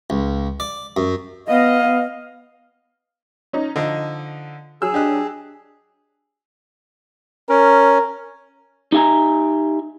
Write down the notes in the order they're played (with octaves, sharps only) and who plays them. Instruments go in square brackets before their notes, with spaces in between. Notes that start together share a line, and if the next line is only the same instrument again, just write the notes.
[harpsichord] C#2
D5
F#2
[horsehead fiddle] B3 [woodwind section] D#5 [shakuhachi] F5
[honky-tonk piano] C#4 D#4
[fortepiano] D3 F3 D#4 [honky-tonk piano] D#5
[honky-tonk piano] F#3 E6 [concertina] G#4
[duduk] D4 [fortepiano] G4 D#5 F#6
[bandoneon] C#4 [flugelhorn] A#4
[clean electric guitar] D#4 G4 E5 G#5 A#5